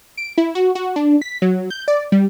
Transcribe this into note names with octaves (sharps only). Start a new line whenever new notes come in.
D7
E4
F#4
F#4
D4
B6
F#3
G6
D5
G3